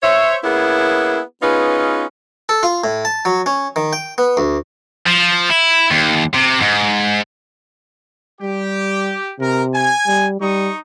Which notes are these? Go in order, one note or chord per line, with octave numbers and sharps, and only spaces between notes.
C5 C#5 E5
A#3 B3 C#4 E4 G#4
B3 C#4 D#4 F4 G#4 B4
A4
F4
A2
A5
F#3
C#4
D#3
G5
B3
D2
F3
E4
D#2
C3
G#2
G3 G4
C3 A#4
G#5
G3
G3 D#4 C#6 D#6